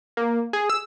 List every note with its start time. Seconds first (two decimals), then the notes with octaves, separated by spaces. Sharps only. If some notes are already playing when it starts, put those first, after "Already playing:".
0.17 A#3
0.53 G#4
0.70 E6